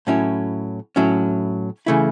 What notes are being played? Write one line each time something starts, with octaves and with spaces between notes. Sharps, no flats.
A2 F#3 C#4 E4
A2 F#3 C#4 E4
C#3 E3 A3 E4